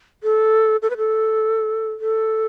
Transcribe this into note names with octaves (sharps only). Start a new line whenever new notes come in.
A4
A4
B4
A4
A4